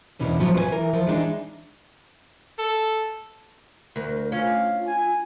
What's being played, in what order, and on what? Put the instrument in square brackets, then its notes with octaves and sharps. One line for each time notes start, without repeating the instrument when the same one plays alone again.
[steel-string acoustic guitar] E2 G#2 B2 E3 C#4 D4
G#2 C#3 F3 F#3
C3 B4 C5 G#5
E3 A#4
G2 F3
E3 G#3 C4 D4 D#4
[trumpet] A4
[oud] D2 [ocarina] A#4
[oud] C#4 [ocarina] F4 [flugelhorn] F5
[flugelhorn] G#5